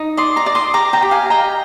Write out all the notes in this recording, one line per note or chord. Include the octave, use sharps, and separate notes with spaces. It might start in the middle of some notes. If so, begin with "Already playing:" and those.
Already playing: D#4
D5 C6 D#6
A#5 D6
D5
C6 D#6
G4 A#5 D6
G5 A#5
G4
F5 G#5
D#5 G5 A#5